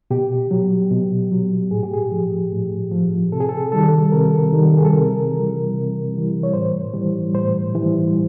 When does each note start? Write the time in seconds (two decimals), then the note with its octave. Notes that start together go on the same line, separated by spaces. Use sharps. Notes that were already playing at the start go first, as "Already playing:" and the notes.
0.11 B2 G4
0.51 F#3
0.91 B2
1.32 F#3
1.71 A2 G#4
1.83 G4
1.94 G#4
2.11 F3
2.52 A2
2.91 F3
3.32 C3 A4
3.41 G#4
3.49 A4
3.72 D#3 G3 A4
4.12 C3 A#4
4.53 D#3 G3
4.77 G#4
4.85 A4
4.93 C3 A#4
5.33 E3 G3
5.73 C3
6.14 E3 G3
6.43 C#5
6.53 A2 C5
6.94 E3 G3
7.34 A2 C5
7.75 E3 G3